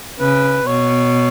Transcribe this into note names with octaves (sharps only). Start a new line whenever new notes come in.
C#3 B4
B2 C#5